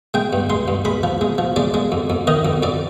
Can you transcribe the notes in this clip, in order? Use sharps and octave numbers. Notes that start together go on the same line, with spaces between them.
G#3 G5
G2
G#3 C6
G2
G#3 B5
F3
G#3
F3
G#3 D5
G#3
F2
F2
D#3 D#5
F2
F2 D5